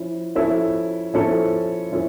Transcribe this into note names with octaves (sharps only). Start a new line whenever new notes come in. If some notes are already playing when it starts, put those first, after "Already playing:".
Already playing: F3 C#4 E4
F3 C#4 E4 A4
F3 C#4 E4 A4
F3 C#4 E4